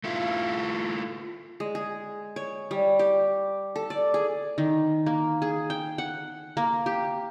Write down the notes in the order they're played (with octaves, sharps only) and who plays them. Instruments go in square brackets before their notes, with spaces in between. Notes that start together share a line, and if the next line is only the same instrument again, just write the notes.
[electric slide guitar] A3 E4 F4
[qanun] G#3
G#4
C#5
G3
G4
A4
D5
G#4
D#3
A#3
G#4
G5
F#5
A#3
G4